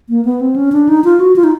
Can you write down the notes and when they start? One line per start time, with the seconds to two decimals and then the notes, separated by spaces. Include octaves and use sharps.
0.09 A#3
0.25 B3
0.41 C4
0.56 C#4
0.72 D4
0.89 D#4
1.04 F4
1.20 F#4
1.36 F4
1.44 D#4